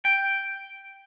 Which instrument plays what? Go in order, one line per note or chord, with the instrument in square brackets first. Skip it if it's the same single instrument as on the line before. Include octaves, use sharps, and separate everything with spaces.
[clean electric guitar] G5